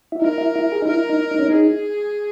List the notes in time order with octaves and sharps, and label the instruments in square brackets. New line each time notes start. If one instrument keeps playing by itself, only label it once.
[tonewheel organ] E4
[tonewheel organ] D#4 [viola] A#4
[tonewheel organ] E4
E4
G#4
D#4
[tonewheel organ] E4 [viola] A#4
[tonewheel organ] D#4
D#4
C#4
D#4
[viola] G#4